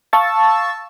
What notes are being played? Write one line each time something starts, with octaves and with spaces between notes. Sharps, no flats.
F5 A5 C#6 E6 A6